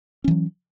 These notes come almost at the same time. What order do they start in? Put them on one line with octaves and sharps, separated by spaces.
C#4 E3 F#3